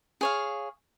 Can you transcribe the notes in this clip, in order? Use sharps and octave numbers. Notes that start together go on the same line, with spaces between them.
G#4 C#5 F5